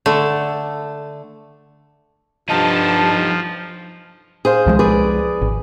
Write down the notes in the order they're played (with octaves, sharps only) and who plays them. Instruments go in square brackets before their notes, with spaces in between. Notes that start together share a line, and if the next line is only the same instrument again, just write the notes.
[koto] D3 A3
[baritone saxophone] G2 [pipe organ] F3 [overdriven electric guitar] D#4 A4 [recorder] A5
[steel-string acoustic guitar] G#4 C5 F5
[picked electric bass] C2 F3 G#3
[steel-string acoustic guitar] G#4 B4 D5
[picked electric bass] G#1